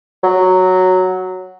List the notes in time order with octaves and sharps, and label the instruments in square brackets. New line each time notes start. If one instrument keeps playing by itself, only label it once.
[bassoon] F#3